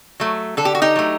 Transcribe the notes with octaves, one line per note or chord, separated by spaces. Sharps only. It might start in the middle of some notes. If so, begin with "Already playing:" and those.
F#3 A3
D3 A4
G4
F#4
D#4 G4
F#3 A3